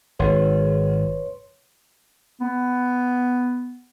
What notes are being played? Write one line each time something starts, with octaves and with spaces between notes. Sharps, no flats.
G#1 B4 C#5 C6
B3